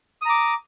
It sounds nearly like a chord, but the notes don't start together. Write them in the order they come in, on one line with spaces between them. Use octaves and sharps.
D#6 A#5 D6